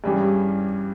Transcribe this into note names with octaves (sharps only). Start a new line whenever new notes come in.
G2 E3 G3 C#4 G#4